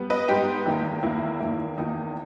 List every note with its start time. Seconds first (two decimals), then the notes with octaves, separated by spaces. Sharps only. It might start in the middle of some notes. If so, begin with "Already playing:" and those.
Already playing: G3 B3
0.10 B4 D#5
0.28 G#2 G3 B3 D#4 G4
0.66 E2 D#3 A#3
1.03 E2 D#3 A#3 E4
1.40 E2 D#3 A#3
1.78 E2 D#3 A#3 D#4